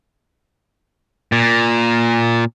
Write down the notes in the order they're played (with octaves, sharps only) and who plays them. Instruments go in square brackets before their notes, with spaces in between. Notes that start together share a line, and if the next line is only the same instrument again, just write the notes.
[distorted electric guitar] A#2